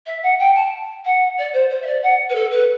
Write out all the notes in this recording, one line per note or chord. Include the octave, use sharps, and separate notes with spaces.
E5
F#5
G5
A5
F#5
D5
C5
C5
E5
D5
F#5
B4
A4
B4